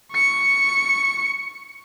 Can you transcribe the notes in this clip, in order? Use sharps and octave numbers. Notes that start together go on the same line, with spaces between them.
C#6 C#7